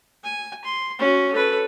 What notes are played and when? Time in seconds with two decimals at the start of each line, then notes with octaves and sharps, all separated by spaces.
0.24 G#5
0.65 C6
0.99 C#4 F#4
1.32 A4 B4